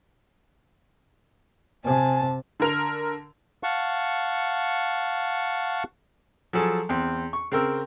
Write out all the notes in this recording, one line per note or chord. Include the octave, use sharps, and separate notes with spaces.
C3 G#5 A5
D3 A#4 F7
F5 F#5 A5 C#6
F3 F#3 G#4 A4
E2 C4
C#6
C#3 C4 A#4 G5 E6